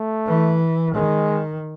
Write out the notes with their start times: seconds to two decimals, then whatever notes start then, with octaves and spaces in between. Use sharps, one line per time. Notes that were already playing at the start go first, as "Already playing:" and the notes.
Already playing: A3
0.27 E3
0.95 D#3 G#3